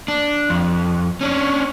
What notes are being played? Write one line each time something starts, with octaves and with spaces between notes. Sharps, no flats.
D4
F2
C#4 D4